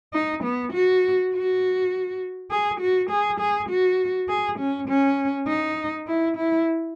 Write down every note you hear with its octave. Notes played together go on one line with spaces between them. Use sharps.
D#4
B3
F#4
F#4
G#4
F#4
G#4
G#4
F#4
G#4
C#4
C#4
D#4
E4
E4